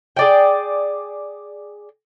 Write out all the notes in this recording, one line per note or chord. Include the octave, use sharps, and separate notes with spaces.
G#4 D5 G5